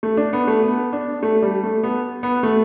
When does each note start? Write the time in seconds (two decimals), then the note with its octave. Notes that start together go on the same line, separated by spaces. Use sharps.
0.03 A3
0.17 D4
0.33 B3
0.47 A3
0.63 B3
0.93 D4
1.23 A3
1.42 G3
1.63 A3
1.83 B3
2.23 B3
2.43 A3